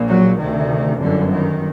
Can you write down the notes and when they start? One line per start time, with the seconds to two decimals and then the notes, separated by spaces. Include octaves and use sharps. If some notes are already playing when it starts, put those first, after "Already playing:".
Already playing: A#1 A#2
0.08 F#3
0.39 D2 C3 D#3
1.01 G1 F#2 D3
1.31 D#3